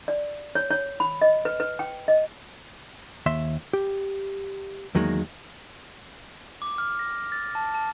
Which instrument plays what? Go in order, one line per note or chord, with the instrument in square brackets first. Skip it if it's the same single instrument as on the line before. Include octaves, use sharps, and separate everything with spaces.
[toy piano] D5
C#5
C#5
B5
D#5
B4
B4
G5
D#5
[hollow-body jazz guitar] D#2 E5 C6
G4
E2 D#3 F#3 G#3 A#3
[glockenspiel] D6
F6
A#6
A6
A5
A5